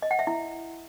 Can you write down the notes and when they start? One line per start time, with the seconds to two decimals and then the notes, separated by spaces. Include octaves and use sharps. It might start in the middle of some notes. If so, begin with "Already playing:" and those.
0.02 D#5
0.11 F#5
0.19 E5
0.27 E4